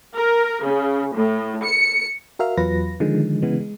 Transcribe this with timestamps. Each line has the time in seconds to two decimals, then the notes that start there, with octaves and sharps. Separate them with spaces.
0.15 A#4
0.63 C#3
1.14 A2
1.63 C#7
2.39 F#4 A#4 E5 F5 F6
2.57 E2 F#3 F4 B4 A#6
3.00 D3 D#3 F3 G#3
3.42 C#3 E3 G#3 B3
3.61 G#3